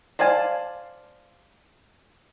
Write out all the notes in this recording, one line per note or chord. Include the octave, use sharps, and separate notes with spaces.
C5 D5 F5 G#5 A5